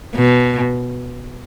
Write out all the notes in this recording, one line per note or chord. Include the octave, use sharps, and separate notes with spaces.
B2